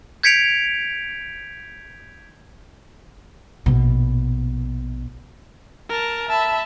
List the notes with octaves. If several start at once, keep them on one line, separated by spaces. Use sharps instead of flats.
G6 G#6 B6 C#7 D7 F7
A#1 B2
A#4 A5
E5 A5 B5